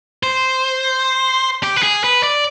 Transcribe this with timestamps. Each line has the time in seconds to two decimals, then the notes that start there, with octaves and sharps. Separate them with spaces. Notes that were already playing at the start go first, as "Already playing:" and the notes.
0.23 C5
1.63 G4
1.76 B4
1.83 G#4
2.04 B4
2.23 D5